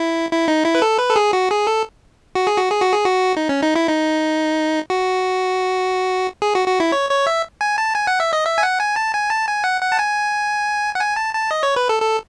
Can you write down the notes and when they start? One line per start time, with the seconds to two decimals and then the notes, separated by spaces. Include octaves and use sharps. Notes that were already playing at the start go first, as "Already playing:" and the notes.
Already playing: E4
0.31 E4
0.48 D#4
0.65 E4
0.75 B4
0.82 A4
0.99 B4
1.09 A4
1.16 G#4
1.33 F#4
1.51 G#4
1.67 A4
2.35 F#4
2.47 G#4
2.58 F#4
2.70 G#4
2.82 F#4
2.93 G#4
3.05 F#4
3.37 D#4
3.49 C#4
3.62 D#4
3.76 E4
3.88 D#4
4.90 F#4
6.42 G#4
6.55 F#4
6.68 F#4
6.80 E4
6.92 C#5
7.10 C#5
7.27 E5
7.61 G#5
7.78 A5
7.95 G#5
8.07 F#5
8.20 E5
8.33 D#5
8.46 E5
8.58 G#5
8.63 F#5
8.79 G#5
8.96 A5
9.14 G#5
9.30 A5
9.47 G#5
9.64 F#5
9.82 F#5
9.92 A5
9.99 G#5
10.95 F#5
10.99 G#5
11.16 A5
11.34 A5
11.51 D#5
11.63 C#5
11.76 B4
11.89 A4
12.02 A4